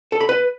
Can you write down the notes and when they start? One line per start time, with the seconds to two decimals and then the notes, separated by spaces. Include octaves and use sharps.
0.12 A4
0.21 B5
0.29 B4